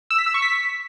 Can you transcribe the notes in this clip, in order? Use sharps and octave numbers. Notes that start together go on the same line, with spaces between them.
E6
B6
E6
C#6
B6